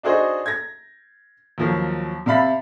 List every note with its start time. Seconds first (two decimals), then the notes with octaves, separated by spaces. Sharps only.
0.03 D4 D#4 F#4 G#4 C5 D#5
0.46 G#6 A#6
1.58 D#2 F3 F#3
2.26 C3 E5 F5 B5 A6 B6